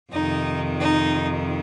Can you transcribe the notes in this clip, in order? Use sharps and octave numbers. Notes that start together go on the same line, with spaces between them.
F2 C3 D#3 D#4
D#4